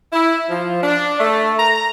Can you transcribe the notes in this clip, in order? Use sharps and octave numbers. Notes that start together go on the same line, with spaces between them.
E4
F3
D4
A3
A#5